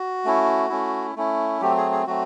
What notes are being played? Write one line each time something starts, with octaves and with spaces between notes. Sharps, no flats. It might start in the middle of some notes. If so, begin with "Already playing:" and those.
Already playing: F#4
A3 C#4 E4
A3 C#4 E4
A3 C#4 E4
F#3 A3 C4 G4
G#4
G#4
F#3 A3 C4 F#4